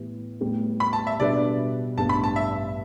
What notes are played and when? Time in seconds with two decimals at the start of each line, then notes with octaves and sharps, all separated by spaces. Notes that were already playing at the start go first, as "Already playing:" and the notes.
Already playing: A2 E3 B3 G4
0.41 A2 G3 B3 G4
0.80 B5
0.93 A5
1.07 E5
1.19 B2 G3 D4 B4 D5 E5
1.97 A1 G2 G3 B3 A5
2.09 B5
2.24 A5
2.36 E5